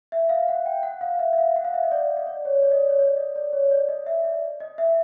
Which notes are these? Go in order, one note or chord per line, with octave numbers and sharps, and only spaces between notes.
E5
F5
F#5
G5
F#5
F5
E5
E5
F5
F#5
F5
E5
D#5
D5
D#5
D5
C#5
D5
D#5
D5
C#5
D5
D#5
D5
C#5
D5
D#5
E5
D5
D#5
E5